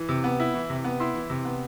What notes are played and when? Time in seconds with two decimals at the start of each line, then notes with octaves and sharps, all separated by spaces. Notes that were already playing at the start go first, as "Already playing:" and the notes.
Already playing: E3
0.09 C3
0.24 B3
0.40 E4
0.54 E3
0.70 C3
0.84 B3
1.00 E4 C6
1.15 E3
1.30 C3
1.45 B3